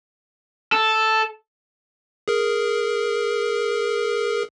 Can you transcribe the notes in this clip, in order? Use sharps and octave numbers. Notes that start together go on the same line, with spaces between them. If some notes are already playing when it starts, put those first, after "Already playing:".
A4
G#4 A#4